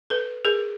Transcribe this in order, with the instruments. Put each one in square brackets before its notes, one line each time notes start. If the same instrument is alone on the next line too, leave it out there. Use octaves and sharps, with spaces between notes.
[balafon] A4 B4
G#4 A#4